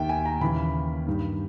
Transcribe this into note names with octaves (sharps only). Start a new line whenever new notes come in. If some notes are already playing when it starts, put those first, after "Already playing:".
Already playing: D#2 D#3 E5 G5
G#5
A#5
D#2 C#3 E3 B5
G2 D#3